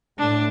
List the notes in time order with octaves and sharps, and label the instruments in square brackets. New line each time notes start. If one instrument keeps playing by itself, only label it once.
[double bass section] A2 [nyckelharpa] D4